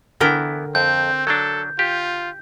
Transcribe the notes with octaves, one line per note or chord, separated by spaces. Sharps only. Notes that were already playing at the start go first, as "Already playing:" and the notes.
D3 E3 B3 E4 A#4 G5
F2 C4 G6
F#3 D4 A4
F4 G4